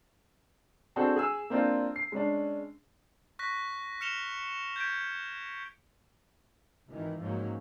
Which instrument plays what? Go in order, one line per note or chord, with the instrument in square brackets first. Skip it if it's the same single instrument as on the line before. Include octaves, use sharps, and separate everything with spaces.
[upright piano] C4 D4 F#4 G#4 A4
G#4 G#5 E6
A#3 C4 D4 F4
C7
G#3 C#4 D4
[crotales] C#6 F#6 A#6 B6
F6 C#7 E7 F7 G7
G6 G#6 B6 D7
[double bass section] G#1 D#3 E3
G#2 F3 F#3 G#3 A#3 C#4